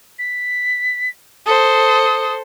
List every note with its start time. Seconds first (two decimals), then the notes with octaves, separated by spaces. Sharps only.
0.19 B6
1.46 A4 C5 D#6